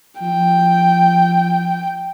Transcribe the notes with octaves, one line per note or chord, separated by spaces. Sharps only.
F3 G5